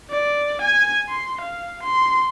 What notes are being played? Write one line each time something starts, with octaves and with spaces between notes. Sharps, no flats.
D5
G#5
C6
F5
C6